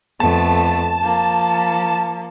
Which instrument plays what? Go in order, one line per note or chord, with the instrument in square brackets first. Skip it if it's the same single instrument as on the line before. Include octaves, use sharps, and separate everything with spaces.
[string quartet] F2 A3 B3 [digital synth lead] A5
[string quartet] F3 A#3